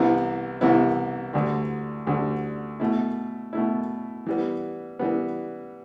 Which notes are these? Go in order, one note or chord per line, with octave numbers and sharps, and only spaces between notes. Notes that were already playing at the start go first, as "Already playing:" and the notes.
Already playing: C2 C3 E3 B3 E4
C2 C3 E3 B3 E4
D2 D3 G3
D2 D3 G3
B2 A3 E4
B2 A3 E4
E3 G3 B3
E3 G3 B3